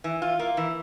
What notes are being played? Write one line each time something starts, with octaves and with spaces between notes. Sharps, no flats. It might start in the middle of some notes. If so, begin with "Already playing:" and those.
E3
F4
A#3
E3